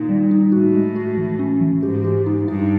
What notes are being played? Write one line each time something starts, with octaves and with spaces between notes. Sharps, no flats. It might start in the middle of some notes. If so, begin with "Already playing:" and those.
Already playing: A#2 D#3 A#3 D#4
G3
D#4
A2 F#4
G#3
F#4
E3
C#4
E3
G#2 G4
G4
D#4
G2 D#4